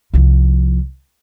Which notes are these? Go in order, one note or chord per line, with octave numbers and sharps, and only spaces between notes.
C2 F3